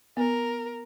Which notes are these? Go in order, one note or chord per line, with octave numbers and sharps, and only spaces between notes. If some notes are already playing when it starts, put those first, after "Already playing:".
B3 A#4